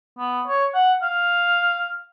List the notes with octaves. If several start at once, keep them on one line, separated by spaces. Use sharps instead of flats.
B3
C#5
F#5
F5